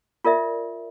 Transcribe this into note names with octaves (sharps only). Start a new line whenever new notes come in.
F4 A#4 D5 E5